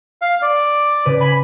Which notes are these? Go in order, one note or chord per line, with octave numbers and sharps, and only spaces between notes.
F5
D5
C#3 B4
G#5 B5